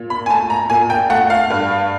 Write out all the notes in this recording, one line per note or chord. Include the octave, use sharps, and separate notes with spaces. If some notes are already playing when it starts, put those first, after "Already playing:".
Already playing: A#2
B5
G#5
A3 A5
A#5
A#2 G#5
G5
A3 F#5
F5
G2